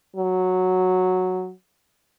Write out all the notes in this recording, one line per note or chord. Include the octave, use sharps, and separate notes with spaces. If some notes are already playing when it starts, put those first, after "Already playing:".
F#3